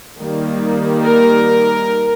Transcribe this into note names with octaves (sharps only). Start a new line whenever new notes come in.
D#3 G3 A#3
A#4